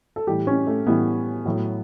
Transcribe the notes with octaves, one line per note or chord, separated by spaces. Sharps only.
A4
A2 E3 G3 G4
C#4
A3
A2 E3 G3 B3
A2 F#3